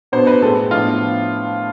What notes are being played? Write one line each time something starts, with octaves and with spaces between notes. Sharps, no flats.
B2 B3 D4 C5
B4
A2 G#3 C4 A4
A2 F3 B3 D4 F4